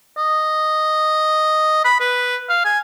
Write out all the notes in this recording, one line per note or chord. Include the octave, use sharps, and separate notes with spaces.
D#5
B5
B4
F5
G#5